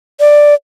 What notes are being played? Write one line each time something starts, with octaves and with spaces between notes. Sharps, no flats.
D5